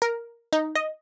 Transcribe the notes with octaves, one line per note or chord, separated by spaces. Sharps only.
A#4
D#4
D#5